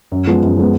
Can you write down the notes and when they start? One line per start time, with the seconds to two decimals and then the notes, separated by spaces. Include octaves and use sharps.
0.12 F#2
0.27 F3 G#3 B3
0.43 F#2
0.57 F3 G#3 B3